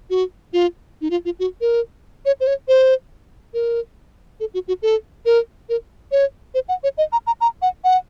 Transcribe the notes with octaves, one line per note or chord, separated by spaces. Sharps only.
F#4
F4
D#4
F4
F4
F#4
A#4
C#5
C5
C#5
C5
A#4
A4
F#4
F#4
A4
A#4
A#4
C#5
C5
F#5
C#5
D#5
A#5
A#5
A#5
F#5
F#5